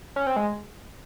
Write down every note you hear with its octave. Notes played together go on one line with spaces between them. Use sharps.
C#4
C4
G#3